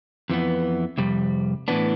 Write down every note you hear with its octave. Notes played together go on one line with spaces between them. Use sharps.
F2 E3 B3
F2 C3 G3
A2 E3 B3 D4